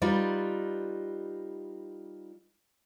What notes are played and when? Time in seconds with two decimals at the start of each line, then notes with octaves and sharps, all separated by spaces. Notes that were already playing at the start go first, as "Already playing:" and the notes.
0.02 G3 D#4 F4 B4